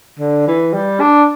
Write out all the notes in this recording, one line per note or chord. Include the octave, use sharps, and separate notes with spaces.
D3
E3
G3
D4